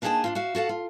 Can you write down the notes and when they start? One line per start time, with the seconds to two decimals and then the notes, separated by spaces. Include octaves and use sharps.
0.02 A#3 D4 D#4 G#4 G5 A5
0.24 D4 D#4 F4
0.35 F#4 E5 F5
0.55 F#4 A4 F5 F#5
0.69 F4